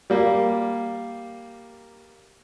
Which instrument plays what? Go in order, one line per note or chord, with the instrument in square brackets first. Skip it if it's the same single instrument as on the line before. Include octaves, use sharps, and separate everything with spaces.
[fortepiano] G3 A#3